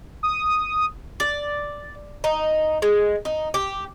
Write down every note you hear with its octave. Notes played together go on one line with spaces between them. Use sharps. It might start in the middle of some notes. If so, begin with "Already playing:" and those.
D#6
D5
D#4
G#3
D#4
G4